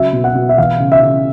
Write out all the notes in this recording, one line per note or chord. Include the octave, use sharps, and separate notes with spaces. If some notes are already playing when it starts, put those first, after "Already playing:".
Already playing: C#3 F#3 E5
B2
F#5
B2
E5
E3 F5
C#3
E5
C#3